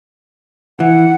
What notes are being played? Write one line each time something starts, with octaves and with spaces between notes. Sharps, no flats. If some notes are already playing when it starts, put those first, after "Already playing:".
E3 F#5